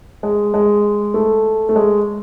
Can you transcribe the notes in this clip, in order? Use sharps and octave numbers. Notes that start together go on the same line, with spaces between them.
G#3
G#3
A3
A3
G#3